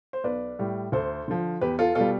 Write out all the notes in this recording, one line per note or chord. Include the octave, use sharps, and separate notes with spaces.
C5
B1 B4 D5
A2 G3
D2 A4 C5
D3 F3
E2 G4 B4
F4 A4
B2 G3 F4 A4